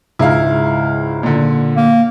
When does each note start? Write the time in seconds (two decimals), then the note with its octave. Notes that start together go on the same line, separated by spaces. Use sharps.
0.19 C#2 G#2 E4 F5
1.23 A#2 D3
1.77 A#3